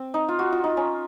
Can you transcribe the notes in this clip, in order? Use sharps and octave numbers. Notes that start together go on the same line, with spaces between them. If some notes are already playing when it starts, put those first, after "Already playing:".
Already playing: C4
D#4
F4
F#4
F4
D#4
C#4